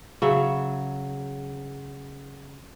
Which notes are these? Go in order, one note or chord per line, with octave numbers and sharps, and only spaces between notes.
C#3 F#3 E5